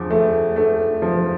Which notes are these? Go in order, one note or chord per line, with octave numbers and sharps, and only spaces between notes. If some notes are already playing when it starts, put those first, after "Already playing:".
Already playing: E2 F3
A3
A3
F3